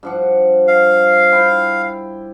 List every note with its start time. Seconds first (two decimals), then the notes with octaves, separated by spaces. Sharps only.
0.03 G2 F3 F#5
0.67 F5
1.32 E4 F4 G5